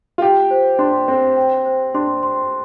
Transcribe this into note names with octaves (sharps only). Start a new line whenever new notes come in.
F4
G4 G5
C5
D4 C6
C4 C5
G5
C5
D4 C6
C6